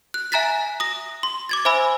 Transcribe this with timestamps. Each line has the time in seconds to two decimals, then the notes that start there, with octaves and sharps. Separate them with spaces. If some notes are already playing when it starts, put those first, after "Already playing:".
0.14 F#6
0.32 E5 G#5 A#5 F#6 A6 B6
0.80 D#6 A#6
1.23 C6
1.49 D6 G#6 A6
1.65 C5 E5 G#5 B5 E6